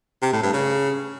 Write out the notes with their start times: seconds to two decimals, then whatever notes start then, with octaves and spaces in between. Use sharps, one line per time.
0.22 C3
0.33 A2
0.43 G2
0.53 C#3